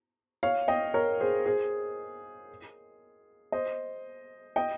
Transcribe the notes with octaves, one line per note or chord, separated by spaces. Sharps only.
C#5 F5
D#5 G5
A#4 C#5
G#4 C5
G#4 C5
C5 D#5
D#5 G5